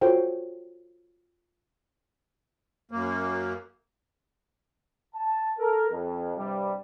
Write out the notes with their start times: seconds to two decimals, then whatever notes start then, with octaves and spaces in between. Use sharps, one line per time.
0.01 F4 F#4 A4 C5 C#5 G5
2.91 F#2 A#3
5.15 A5
5.58 A4 A#4
5.91 F2
6.37 G2 C3 G3